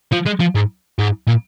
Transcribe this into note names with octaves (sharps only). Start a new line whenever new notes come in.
F3
G#3
F3
G#2
G#2
A#2